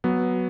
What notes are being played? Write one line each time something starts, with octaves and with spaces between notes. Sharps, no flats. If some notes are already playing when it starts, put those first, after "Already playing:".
F#3 B3